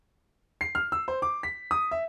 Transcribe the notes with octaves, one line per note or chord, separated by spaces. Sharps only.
C7
F6
E6
C5
D6
B6
D#6
E5